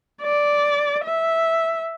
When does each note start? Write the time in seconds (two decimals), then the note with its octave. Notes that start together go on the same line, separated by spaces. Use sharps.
0.22 D5
1.05 E5